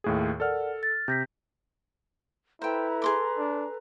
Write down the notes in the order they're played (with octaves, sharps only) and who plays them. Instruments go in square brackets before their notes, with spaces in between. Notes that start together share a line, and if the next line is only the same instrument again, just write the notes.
[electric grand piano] D#2 A2 G#4
[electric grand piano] A4 F6 [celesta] A#4 D5 F#5
[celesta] A6
[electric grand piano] C3 [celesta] G6 A#6 B6
[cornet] E4 [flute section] A4 B4 A#5 [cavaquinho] C5 G5
[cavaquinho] G#4 C6 D6
[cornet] D4